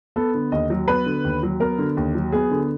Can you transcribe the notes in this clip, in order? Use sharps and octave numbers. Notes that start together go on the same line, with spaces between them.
B3 A4
D3
D#2 D#5
F#3
B3 B4
D3
D#2
F#3
B3 A#4
D3
D#2
F#3
B3 G#4
D3